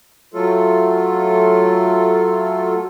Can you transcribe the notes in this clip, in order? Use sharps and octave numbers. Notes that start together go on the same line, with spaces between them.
F#3 A3 F4 A4